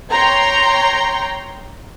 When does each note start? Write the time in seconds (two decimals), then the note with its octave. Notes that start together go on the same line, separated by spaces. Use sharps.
0.12 C#5 G5 A#5 C6